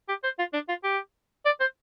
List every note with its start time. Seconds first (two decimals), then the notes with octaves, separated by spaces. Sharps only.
0.08 G4
0.24 C5
0.39 F4
0.53 D4
0.68 F4
0.84 G4
1.45 D5
1.60 C5